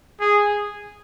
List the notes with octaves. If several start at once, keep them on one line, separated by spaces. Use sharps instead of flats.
G#4